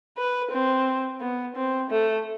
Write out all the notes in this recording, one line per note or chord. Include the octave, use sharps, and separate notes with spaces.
B4
C4
B3
C4
A3